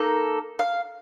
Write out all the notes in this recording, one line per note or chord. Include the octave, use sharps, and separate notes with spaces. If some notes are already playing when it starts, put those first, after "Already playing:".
Already playing: A#3 D#4 A4
F5